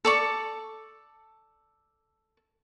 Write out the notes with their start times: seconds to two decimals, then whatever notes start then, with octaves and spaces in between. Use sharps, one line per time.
0.05 A4 D5 C#6